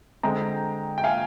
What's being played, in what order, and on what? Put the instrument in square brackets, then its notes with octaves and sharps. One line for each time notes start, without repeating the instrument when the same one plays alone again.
[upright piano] D3 G#3 C4 G5 A#5
G5
F5 G#5